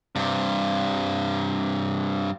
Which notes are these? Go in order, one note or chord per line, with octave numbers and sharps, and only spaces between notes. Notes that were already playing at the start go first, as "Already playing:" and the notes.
G2 C3